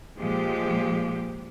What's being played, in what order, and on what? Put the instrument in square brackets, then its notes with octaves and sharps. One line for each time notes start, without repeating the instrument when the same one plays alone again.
[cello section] A#2 F3 G#3 G4